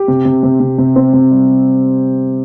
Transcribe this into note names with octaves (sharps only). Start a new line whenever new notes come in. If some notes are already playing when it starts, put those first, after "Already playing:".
Already playing: G4
C3
C3
C3
C3
C3
C4
C3
G3